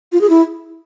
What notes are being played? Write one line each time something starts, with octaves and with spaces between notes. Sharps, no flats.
F4
G#4
E4